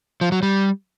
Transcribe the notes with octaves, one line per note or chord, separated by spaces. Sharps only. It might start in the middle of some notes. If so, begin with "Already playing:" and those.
F3
F#3
G3